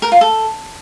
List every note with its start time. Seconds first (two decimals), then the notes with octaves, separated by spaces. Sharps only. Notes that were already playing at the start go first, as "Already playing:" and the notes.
0.02 A#4
0.12 F4
0.21 A4